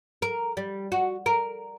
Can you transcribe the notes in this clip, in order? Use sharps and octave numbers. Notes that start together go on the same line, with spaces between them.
A#4
G3
F#4
A#4